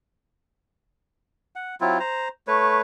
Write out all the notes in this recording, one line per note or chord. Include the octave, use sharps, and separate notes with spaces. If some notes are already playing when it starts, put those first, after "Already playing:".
F#5
F#3 C4 E4 F4
C5 A#5
A3 B4 C#5